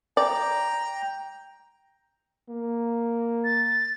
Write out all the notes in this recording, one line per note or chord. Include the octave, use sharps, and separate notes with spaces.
D5 G5 A#5
A#3
A6